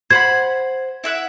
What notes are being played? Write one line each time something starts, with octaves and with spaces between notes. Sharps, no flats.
C5 F#5 B5 G#6
E4 E5 F#5